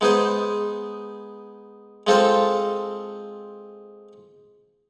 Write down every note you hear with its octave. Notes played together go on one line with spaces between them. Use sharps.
G#3 B3 D#4 G#4 C5
G#3 C4 F4 A4 C5